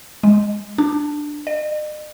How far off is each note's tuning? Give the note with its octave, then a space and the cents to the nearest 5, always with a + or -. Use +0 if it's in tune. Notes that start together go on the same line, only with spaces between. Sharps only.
G#3 -5
D4 +10
D#5 -45